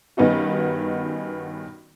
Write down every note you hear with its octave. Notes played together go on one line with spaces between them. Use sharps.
G2 D#3 B3 C#4 D#4 F#4